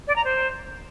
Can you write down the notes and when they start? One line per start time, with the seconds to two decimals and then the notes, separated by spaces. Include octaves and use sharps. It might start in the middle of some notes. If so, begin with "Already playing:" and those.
0.08 D5
0.16 A#5
0.25 C5